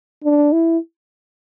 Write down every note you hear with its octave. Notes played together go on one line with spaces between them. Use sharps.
D4
E4